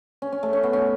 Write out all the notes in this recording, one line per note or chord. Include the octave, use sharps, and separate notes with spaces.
C#4
C#4
A3
C#4
B3
C#4